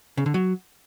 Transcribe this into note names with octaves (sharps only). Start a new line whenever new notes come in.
C#3
D3
F#3